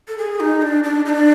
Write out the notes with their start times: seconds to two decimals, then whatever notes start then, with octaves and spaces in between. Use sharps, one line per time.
0.08 A4
0.18 G#4
0.40 D#4
0.62 D4
0.84 D4
1.05 D#4
1.09 D4